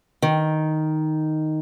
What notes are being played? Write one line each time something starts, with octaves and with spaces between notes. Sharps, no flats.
D#3